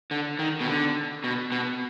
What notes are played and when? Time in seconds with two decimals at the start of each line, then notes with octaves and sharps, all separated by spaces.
0.11 D3
0.39 D#3
0.61 B2
0.67 D3
1.24 B2
1.52 B2